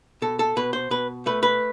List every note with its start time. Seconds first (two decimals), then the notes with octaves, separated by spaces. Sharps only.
0.22 B2 A4
0.39 A4
0.56 B2 B4
0.73 C5
0.90 B2 B4
1.26 A3 B4
1.43 B4